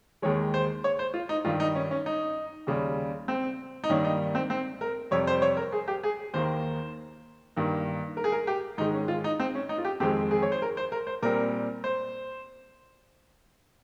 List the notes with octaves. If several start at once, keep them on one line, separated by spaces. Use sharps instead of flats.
D#2 D#3 G#3 C#5
C5
C#5
C5
F4
D#4
G2 D#3 G3 F4
D#4
C#4
C#4
D#4
D#2 C#3 G3
C4
D#4
G2 D#3 G3 A#3 C#4
D#4
C4
C4
A#4
F2 C3 G3 C#5
C5
C5
C#5
A#4
G#4
G4
G#4
D#2 D#3 A#3 C5
G2 D#3 A#3
A#4
G#4
A#4
G4
G#2 D#3 G#3 D#4
C#4
F4
D#4
C4
C#4
D#4
F4
G4
F2 D#3 G#3 C4 G4
G#4
C#5
C5
A#4
C5
A#4
C5
A#2 G3 C4 A#4
C5